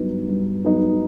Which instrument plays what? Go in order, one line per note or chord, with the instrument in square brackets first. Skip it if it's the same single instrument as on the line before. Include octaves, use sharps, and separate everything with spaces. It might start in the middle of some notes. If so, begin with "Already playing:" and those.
Already playing: [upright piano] G2 F#3 B3 D#4
G2
F#3 B3 D#4